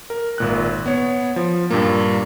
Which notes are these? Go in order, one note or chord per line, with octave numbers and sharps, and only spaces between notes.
A#4
G#1 A#2 F#6
B3 C#5
F3
G2 A#2 A#3